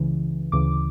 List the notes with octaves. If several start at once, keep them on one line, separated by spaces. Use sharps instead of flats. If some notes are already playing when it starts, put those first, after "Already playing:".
Already playing: C#2 C#3 E3
D2 C#3 E3 D6